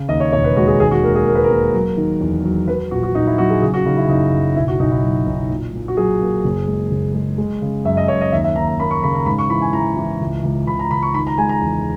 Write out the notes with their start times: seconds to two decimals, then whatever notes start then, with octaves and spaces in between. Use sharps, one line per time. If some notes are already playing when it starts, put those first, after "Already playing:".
Already playing: C#3
0.09 D#2 D#5
0.20 C#5
0.33 E1 C#5
0.44 B4
0.56 G#3 F#4
0.67 G#4
0.80 D#2 G#4
0.91 F#4
1.03 D#2 A#4
1.15 G#4
1.26 A#3 A#4
1.35 B4
1.44 A#4
1.50 A#3
1.73 F#3
1.97 D#3
2.21 E2
2.44 F#3
2.68 F#3 B4
2.91 A#1 F#4
3.03 F#4
3.15 A#1 D#4
3.27 E4
3.38 F#3 F#4
3.50 G#4
3.62 C#3 G#4
3.74 F#4
3.86 C#3 D#4
3.97 E4
4.09 F#1 D#4
4.33 F#1
4.56 B1 E4
4.68 F#4
4.80 B1 D#4
4.91 E4
5.03 F#3
5.26 B1
5.50 A#2
5.74 A#2
5.88 F#4
5.97 F#3 G#4
6.21 A#3
6.44 F#1
6.67 G#3
6.91 F#1
7.14 G#3
7.38 G#3
7.62 C#3
7.85 F#2 E5
7.97 D#5
8.08 F#2 C#5
8.21 D#5
8.32 D#2 E5
8.44 E5
8.56 D#2 A#5
8.67 A#5
8.79 A#3 B5
8.91 C#6
9.03 C#3 B5
9.15 A#5
9.26 G#2 B5
9.39 C#6
9.50 E3 B5
9.61 G#5
9.73 E3 A#5
9.97 E3
10.21 C#2
10.43 C#2
10.67 C#2 B5
10.79 A#5
10.91 C#2 B5
11.02 C#6
11.14 D#3 B5
11.27 A#5
11.38 G#3 G#5
11.49 A#5
11.61 E2